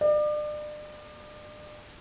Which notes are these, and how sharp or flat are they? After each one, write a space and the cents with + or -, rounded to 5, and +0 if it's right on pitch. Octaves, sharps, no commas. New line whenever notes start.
D5 +35